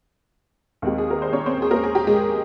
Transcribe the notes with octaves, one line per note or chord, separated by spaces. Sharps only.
D#2 D#3 G#3 C4 D#4 G4
G#4
A#4
C5
C#4 C#5
C4 C5
G#4
A#3 A#4
G#4
G4
G#3 G#4